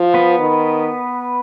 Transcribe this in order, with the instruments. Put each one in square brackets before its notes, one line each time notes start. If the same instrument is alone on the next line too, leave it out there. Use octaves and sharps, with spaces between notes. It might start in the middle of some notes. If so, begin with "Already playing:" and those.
Already playing: [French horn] F3
[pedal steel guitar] B3 B4
[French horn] D#3